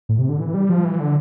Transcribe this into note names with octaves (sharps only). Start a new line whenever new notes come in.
A2
C3
D3
E3
G3
F3
E3
D3